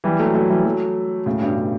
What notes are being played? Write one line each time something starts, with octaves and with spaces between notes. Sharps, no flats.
E3 G3
F#3 A3
F#3 A3
E3 G3
F#3 A3
A2 C#3
G2 B2